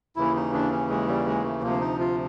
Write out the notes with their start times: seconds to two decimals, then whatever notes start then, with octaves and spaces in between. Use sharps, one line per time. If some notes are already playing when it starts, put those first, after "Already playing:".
0.16 D#2 C#3 E3 E4
0.35 D#4
0.53 D4
0.72 C#4
0.90 G#3
1.08 G3
1.26 G#3
1.44 A3
1.63 D2 C3 F3 A#3
1.81 D#4
2.00 F4